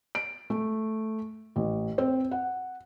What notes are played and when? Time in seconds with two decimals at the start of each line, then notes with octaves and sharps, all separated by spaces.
0.15 D7
0.50 A3
1.56 A1
1.98 C4
2.31 F#5